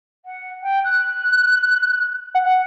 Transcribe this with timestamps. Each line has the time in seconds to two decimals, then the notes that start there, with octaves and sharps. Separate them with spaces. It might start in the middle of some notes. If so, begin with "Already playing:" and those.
0.25 F#5
0.62 G5
0.84 F#6
2.35 F#5